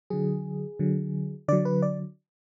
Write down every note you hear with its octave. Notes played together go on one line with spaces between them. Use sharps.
D3 F#3 G#4
D3 F#3
D3 F#3 D5
B4
D5